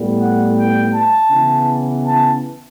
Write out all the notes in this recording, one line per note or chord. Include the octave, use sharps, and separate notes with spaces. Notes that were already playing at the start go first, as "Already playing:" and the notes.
Already playing: A2 G3 B3
F#5
G5
A5
C#3 E3 B3
A5